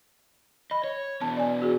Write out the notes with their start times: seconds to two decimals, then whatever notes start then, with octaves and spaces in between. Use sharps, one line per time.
0.71 D#5 B5
0.84 C#5
1.21 B2 E3 B3 A5
1.37 D5 G#5
1.62 F#4 G#4